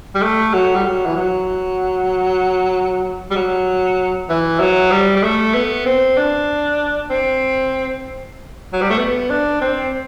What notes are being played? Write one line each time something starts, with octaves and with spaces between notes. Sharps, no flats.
G3
A3
F#3
G3
F#3
E3
F#3
G3
F#3
E3
F#3
G3
G3
A3
B3
C4
D4
C4
F#3
G3
A3
B3
D4
C4